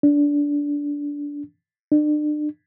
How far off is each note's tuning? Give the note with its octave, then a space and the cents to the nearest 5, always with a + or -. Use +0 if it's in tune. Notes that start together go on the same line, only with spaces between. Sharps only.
D4 -20
D4 +35